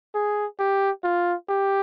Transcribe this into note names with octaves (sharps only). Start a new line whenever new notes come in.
G#4
G4
F4
G4